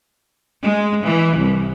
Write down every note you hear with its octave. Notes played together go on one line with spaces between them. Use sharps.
G#3
E3
C2